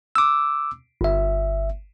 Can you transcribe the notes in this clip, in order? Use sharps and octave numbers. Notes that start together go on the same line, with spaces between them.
D6 E6
G1 E5